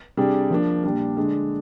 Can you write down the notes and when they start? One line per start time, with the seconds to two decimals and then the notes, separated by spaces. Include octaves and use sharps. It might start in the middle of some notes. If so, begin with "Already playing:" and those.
0.17 C3 G3 D4 G#4
0.50 F3 A#3 D4
0.84 A#2 G3 D4
1.17 D3 G#3 D4